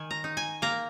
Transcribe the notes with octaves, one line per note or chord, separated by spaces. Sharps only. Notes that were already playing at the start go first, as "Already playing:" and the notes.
Already playing: D#3 G#5
A#5
D#4
G#5
A#3 A#5